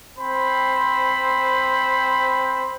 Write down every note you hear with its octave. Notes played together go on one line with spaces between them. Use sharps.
C4 C5 B5